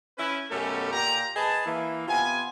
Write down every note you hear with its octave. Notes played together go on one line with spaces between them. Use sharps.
C#4 E4 B4
F#2 B2 A3 C#4 G4 A4
A#2 G4 A#5
G#4 B4 D#5 A5
E3 A#3
C3 B3 F4 G#5